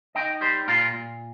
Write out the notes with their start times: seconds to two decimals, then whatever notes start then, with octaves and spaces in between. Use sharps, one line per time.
0.15 D#4 D#5 G5
0.41 G3 G4 C5
0.68 A#2 F4 A#4
0.94 A#2